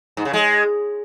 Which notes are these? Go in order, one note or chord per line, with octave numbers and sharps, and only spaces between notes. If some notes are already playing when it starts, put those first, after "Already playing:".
G#2
C#3
G#3